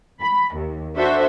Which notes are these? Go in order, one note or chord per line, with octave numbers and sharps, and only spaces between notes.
B5
D#2
D4 F#4 A4 C5 E5